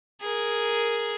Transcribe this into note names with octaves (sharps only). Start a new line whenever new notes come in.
G#4 A#4